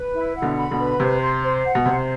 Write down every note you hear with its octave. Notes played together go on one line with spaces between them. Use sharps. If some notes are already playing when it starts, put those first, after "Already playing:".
Already playing: B4
E4
F#5
B2 D3
B5
B2 D3
B4
C3 C5
C6
C5
F#5
B2
C3 C5